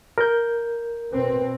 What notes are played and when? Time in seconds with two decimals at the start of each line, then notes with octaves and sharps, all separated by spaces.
0.18 A#4 G6
1.12 B2 C4 B4